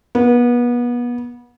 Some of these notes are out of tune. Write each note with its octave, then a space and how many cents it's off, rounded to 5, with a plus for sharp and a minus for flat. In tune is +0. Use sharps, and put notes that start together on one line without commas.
B3 -30